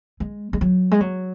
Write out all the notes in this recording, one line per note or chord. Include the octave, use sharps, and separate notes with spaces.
G#3
G#3
F#3
G#3
F#3